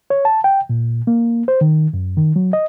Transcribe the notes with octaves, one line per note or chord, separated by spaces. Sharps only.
C#5
A5
G5
A#2
A#3
C5
D#3
F#2
D#3
F#3
D#5